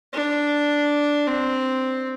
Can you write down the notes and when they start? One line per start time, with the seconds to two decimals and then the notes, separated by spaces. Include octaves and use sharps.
0.13 D4
1.27 C4